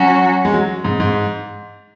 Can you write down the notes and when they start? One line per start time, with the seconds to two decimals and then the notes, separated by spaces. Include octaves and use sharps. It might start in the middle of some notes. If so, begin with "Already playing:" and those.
Already playing: F#3 C#4 F#4
0.45 G#3
0.54 F#3
0.85 G#2
1.00 G#2